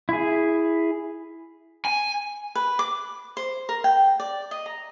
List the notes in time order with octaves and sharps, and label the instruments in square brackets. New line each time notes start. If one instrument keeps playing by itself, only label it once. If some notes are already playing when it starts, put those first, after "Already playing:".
[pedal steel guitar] E4 G#4
[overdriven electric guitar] G#5
[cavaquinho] B4
D6
C5
A#4
G5
D5
D#5
A#5